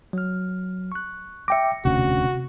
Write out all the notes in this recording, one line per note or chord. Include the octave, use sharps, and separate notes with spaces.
F#3 F6
C#6 F#6
E5 G5 D6 A#6 C#7
E1 D2 C3 C#4 F#4